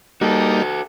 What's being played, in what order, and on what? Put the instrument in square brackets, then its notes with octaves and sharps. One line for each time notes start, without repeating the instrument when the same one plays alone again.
[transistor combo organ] G3 A#3 D#4 [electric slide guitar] F#4 A4